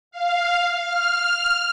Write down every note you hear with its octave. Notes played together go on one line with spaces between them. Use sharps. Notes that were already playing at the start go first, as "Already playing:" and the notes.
F5
F6